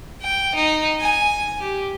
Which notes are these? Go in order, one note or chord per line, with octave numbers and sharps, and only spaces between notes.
G5
D#4
G#5
G4